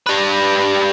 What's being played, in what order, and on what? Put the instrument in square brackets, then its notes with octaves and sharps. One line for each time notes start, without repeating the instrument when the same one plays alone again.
[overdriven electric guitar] G3 B4